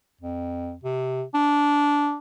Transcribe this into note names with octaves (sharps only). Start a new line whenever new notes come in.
F2
C3
D4